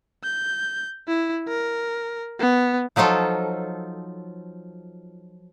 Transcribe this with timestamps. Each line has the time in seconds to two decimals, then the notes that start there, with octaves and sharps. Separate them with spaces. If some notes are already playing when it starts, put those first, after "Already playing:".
0.24 G6
1.08 E4
1.48 A#4
2.39 B3
2.96 F3 F#3 D#4 F4 A4